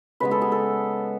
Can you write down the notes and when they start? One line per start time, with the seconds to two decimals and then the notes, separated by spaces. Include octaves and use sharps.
0.20 C#3 G#3 B3 B4
0.31 A4
0.42 G#4
0.52 A4